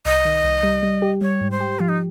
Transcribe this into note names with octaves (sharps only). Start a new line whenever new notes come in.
C2 D#5
D#3
C2
G3
G3
G4
G3 C#5
G#2
C5
G4
F3 F4
D#4